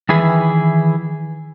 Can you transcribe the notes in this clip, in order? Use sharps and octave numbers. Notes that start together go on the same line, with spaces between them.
D#3 E3 E4 G#4 B4